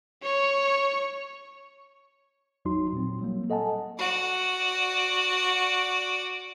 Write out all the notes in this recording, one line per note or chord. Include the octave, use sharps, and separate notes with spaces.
C#5 C#6
G#1 E2 F#3 D#4 F#4 C6
A#2 F#3 C4
F#3 G3 A#3
A4 D#5 F#5 G#5 A5
F#4 D5